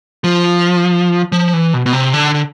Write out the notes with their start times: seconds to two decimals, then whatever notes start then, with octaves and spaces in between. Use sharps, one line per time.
0.24 F3
1.32 F3
1.53 E3
1.74 B2
1.86 B2
1.93 C3
2.13 D3
2.34 D3